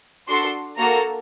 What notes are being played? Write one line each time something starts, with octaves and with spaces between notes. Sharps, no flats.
D4 F#4 A4 C6
A#3 F#4 A4 A#5